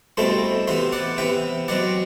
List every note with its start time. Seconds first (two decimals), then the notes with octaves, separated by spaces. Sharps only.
0.17 C2 B2 A3 C4 E4 A4 C5
0.68 C3 E3 B3 C5 E5
0.92 D5 F#5
1.17 C3 E3 B3 E5 G5
1.68 B2 F#3 C4 D5 F#5